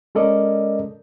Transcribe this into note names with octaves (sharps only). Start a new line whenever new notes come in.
G#3 C#4 A4 A#4 D5 D#5